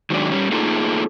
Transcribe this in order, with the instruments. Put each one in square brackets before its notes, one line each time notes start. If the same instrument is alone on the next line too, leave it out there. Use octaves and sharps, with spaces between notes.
[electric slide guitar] D#3 F#3 G#3 D4
G3 C#4
A3 A#3 D#4 F4 G#4 A4